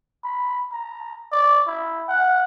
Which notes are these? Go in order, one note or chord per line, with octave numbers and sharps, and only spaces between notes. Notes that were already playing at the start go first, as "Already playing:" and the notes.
B5
A#5
D5
E4
F#5